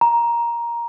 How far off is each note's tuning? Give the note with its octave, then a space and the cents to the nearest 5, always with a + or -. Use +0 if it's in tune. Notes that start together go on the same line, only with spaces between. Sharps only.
A#5 +10